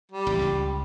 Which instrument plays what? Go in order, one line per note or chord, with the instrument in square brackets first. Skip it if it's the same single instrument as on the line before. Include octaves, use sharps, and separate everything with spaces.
[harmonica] G3
[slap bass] A1
C#2